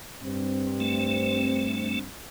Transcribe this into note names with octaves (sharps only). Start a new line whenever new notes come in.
G2 C4
A3